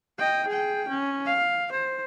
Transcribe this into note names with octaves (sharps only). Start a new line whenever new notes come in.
D#5 G5
G#4 G5
C#4
F5
C5